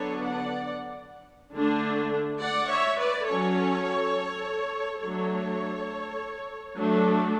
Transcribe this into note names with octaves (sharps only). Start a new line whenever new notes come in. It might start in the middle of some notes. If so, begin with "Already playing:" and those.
Already playing: D3 F#3 B3 D4 A4 C#5
D5 F#5
D3 A3 D4
D5 F#5
C#5 E5
B4 D5
F#3 C#4 A4 C#5
F#3 A3 D4 A4 C#5
F#3 A3 D4